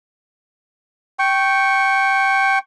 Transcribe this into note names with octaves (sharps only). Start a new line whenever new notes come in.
G5 C#6